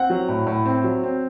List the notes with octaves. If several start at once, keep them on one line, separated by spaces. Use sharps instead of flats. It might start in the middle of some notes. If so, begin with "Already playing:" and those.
Already playing: C4 F#5
F#3
A2
A2
C4
F#3
C4